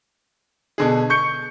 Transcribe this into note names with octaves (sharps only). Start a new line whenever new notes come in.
B2 D3 G#4
C#6 G6 C#7